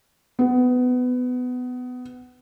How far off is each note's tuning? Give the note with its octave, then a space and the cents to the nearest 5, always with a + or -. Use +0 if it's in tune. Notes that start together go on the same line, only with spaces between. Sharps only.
B3 +20